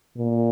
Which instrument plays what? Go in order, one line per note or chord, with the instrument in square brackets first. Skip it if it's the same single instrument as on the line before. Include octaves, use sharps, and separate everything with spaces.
[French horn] A#2